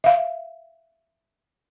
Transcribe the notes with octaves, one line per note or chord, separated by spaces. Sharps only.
E5 F5